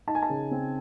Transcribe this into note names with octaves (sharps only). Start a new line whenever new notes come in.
D#4 A5
G#5
A5
C#3
C4